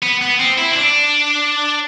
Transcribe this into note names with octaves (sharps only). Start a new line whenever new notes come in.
B3
B3
C4
E4
C4
D4